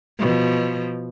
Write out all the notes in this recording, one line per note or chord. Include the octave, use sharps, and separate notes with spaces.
B2 F3